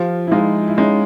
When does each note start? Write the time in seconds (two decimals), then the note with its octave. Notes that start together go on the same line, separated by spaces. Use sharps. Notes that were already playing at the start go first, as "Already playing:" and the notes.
Already playing: F3 F4 G4
0.27 E4
0.32 G#3 D#4 F4
0.68 E4
0.77 G#3 C#4 D#4